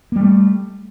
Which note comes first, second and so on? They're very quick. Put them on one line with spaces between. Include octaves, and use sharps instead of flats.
A#3 G3 A3